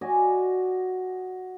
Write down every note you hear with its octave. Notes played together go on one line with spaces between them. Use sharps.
F#4 D5 D#5 G#5